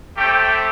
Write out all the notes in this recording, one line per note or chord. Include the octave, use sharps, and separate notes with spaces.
A3 C4 G4 G5